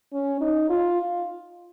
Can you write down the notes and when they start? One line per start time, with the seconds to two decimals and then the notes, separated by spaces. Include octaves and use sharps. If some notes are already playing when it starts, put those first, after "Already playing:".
0.13 C#4
0.41 D#4
0.69 F4